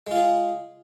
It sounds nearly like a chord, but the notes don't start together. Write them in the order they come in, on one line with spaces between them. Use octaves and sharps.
G#3 F4 G#4